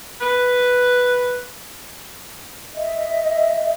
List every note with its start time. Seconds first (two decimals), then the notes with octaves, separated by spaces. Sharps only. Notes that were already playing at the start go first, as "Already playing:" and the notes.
0.21 B4
2.75 D#5 E5